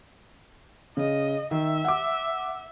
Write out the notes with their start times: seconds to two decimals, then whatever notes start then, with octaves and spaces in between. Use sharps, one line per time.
0.97 C#3 D#5
1.51 D#3 E5
1.84 F#5 D6